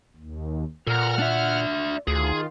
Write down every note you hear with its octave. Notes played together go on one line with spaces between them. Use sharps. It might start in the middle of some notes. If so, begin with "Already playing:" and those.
D#2
A#2 A4 A#4 F#5 F6
D4 E5
D2 D#3 F4 G#4